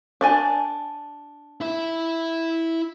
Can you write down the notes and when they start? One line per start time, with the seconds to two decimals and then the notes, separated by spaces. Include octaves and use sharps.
0.21 D4 D5 G#5
1.61 E4 E5